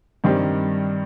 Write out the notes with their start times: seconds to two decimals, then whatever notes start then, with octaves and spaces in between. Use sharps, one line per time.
0.24 G2 D#3 G3 C4